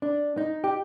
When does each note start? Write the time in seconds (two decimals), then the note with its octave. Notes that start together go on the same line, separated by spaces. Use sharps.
0.02 D4
0.37 D#4
0.64 G4